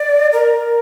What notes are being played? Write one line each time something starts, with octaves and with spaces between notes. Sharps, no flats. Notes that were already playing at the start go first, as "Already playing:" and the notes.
Already playing: D5
A#4